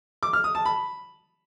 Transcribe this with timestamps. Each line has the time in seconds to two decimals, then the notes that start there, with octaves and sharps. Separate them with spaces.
0.23 D6
0.33 F6
0.44 D#6
0.55 A5
0.65 B5